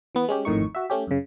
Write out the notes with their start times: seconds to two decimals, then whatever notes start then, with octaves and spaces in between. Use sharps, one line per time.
0.15 E3 B3
0.28 G#3 C#4 G4
0.45 G#1 F2 A2 D#3 D#4 C#6
0.75 F#4 E5
0.90 A3 C#4 G4
1.07 F#2 C#3